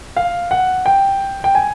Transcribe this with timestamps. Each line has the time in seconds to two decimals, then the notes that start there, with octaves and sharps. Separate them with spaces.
0.16 F5
0.51 F#5
0.86 G5
1.44 G5
1.55 G#5